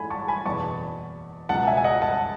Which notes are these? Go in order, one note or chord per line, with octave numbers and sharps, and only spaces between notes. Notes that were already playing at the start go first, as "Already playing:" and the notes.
Already playing: G#2 E3 A3 G#5 B5
A5 C#6
G#5 B5
F#1 E2 B2 A5 C#6
C#2 B2 F#3 F#5 A5
E5 G#5
G#5
D#5 F#5
F#5 A5